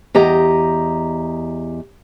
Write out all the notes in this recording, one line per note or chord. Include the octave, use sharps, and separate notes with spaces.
E2 G4 D#5 A#5